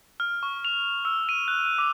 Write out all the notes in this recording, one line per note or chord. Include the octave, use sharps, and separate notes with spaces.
F6
C#6
F7
E6
D#7
F#6
D6